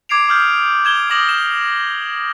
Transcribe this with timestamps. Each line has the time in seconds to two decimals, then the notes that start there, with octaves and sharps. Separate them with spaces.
0.09 D6 G#6 C7 D7 F7
0.28 D6 D#6 F6 G6
0.85 G#6 E7 G7
1.10 D6 D#6 A#6 E7 F#7
1.29 E7